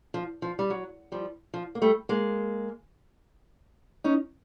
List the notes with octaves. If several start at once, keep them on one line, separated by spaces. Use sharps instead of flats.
F3
F3
G3
F#3
F3 G3
F3
A#3
G3 A3
G#3 A#3
C#4 D#4